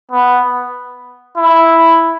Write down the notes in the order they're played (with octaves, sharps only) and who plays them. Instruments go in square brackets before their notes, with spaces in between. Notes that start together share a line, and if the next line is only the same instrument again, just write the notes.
[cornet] B3
E4